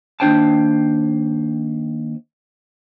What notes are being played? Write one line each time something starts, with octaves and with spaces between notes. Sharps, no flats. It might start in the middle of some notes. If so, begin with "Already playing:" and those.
D#2 C4 D4 C5 G5 A5